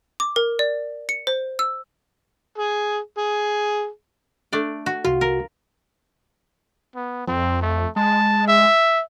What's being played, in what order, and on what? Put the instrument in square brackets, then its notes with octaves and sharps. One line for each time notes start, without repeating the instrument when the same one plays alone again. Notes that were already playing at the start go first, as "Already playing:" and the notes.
[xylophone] D6
A#4
D5
C#7
C5
E6
[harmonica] G#4
G#4
[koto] A3 D4 D5
F#4
[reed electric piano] C2 F#4 [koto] F4
[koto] A#4
[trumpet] B3
[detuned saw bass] F2 [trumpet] C4
[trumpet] A3
[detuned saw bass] G#3 [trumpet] A5
[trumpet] E5